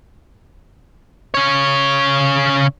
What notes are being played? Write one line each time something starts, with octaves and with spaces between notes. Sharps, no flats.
C#3 C#5